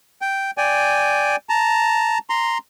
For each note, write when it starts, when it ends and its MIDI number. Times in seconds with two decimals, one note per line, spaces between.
0.21 0.51 79
0.58 1.36 74
0.58 1.36 79
0.58 1.36 80
1.49 2.18 81
1.49 2.18 82
2.30 2.58 82
2.30 2.58 84